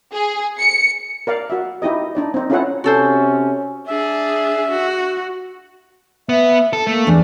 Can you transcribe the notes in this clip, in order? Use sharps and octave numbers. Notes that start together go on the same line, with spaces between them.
G#4
C#7
A#4 D5 F5
F#4 E5
D#4 E4 G4 D#5
D4 D#4 D5
C4 D#4
C#4 E4 F4 A4 C#5 F#5
C3 C#4 F#4 A4 C5
D4 G#4 E5
F#4
B3 E5
A4
A3 A#3
E2 D4